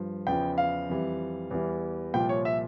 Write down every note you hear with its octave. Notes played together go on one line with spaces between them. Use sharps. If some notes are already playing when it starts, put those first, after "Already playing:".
Already playing: G2 F3
E2 C#3 F3 G5
F5
F2 E3 G3
E2 E3 G3
C2 A#2 F3 G5
C#5
E5